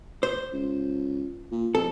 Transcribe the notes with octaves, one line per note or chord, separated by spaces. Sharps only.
C5
C#2
A#2
F2 A4